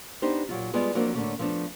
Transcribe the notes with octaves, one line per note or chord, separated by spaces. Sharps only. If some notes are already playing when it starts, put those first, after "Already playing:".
B3 D4 D#4 G4 C5
A#2 F#3 F4
G3 G#3 B3 F4 G#4
F3 F#3 A#3 C4 D4 F#4
A2 D3 E3 A3 A#3 C#4
F3 A3 B3 D4